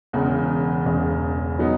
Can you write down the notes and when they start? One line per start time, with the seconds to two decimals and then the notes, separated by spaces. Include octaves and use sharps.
0.13 E1 E2 C#3
0.85 E1 E2 C#3
1.59 F#3 B3 D#4